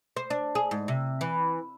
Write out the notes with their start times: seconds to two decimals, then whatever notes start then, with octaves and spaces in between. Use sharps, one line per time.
0.17 C5
0.30 D4
0.55 G#4
0.71 G#2
0.88 C3
1.21 E3